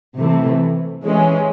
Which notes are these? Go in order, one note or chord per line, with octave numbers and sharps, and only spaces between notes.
C3 E3 A3
E3 G#3 C#4